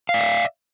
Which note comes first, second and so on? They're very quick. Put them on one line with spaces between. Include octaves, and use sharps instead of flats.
F5 D5 E5